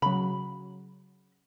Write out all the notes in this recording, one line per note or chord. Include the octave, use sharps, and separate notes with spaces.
C#3 F#3 B5